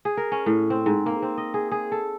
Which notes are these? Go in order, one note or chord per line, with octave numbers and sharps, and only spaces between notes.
G#4
A#4
C#4
A2
C4
G#2
A#3
C4
D#5
G#4
G#4
A4